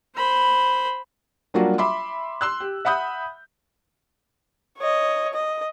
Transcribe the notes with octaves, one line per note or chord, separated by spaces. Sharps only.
C5 B5
F#3 G3 A#3 D4 F4 F#4
E5 B5 C6 D6
C6 E6 F#6
G4
E5 F#5 B5 D#6 G6
C#5 D#5
D#5